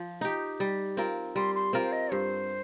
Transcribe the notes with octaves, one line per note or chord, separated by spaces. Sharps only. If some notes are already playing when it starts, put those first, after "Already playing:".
Already playing: F3
D#4 G4
G3
C4 F4 A#4
G3 C6
C6
C4 F4 A#4
C5
D#5
G2 C5